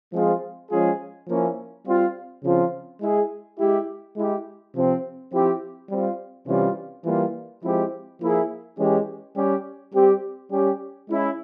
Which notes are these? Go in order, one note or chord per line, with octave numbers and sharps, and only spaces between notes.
F3 G#3 C4 F4 G#4
F3 G#3 C#4 F4 G#4
F3 A#3 C#4 E4
G3 C4 F4
C#3 F3 C4 F4
G#3 E4 G#4
G#3 E4 G4
G#3 E4 G4
C3 F3 C4
F3 C4 E4 G4
G3 C4 F4
C3 E3 G3 C#4 F4
E3 G3 A#3 F4
F3 G#3 C4 E4 G4
F3 A#3 E4 G#4
E3 G#3 C#4 G4
G3 C#4 G4
G3 C4 G4
G3 C#4 G4
G#3 C#4 E4